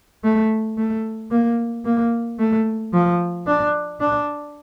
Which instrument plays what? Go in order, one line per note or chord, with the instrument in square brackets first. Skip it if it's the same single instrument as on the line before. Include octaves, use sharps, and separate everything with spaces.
[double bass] A3
A3
A#3
A#3
A3
F3
D4
D4